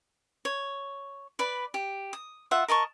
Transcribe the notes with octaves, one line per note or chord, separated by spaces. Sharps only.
C#5
B4 D5 B5
G4
D#6
F4 E5 F#5
A#4 D#5 A5 C#6